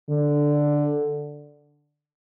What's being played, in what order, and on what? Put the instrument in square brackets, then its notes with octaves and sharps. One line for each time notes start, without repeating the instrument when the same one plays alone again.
[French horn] D3